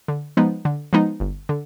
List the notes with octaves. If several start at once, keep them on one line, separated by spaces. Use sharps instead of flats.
D3
F3 G#3 B3 D#4
D3
F3 G#3 B3 D#4
G1
D3